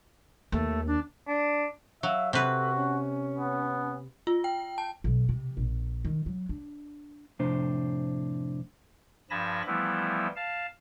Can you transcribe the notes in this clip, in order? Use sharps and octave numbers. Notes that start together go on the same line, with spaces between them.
D#2 A3
D4
D4
F#3 E5 F5
C3 F#4 A4 B4
C#4
B3
F4
G5
A5
B1
C3
A#1
D#3
F#3
D4
F2 A2 C3 D4 C5
G2 F3 G#5 A5 B5 A#6
E3 F3 G3 A3 B3 E4
F5 A5